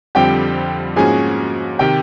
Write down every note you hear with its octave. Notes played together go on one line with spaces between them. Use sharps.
F2 D3 G3 C4 F4 G4 G5
G#2 F3 A#3 C#4 F#4 G#4 G#5
C3 D#3 G4 G5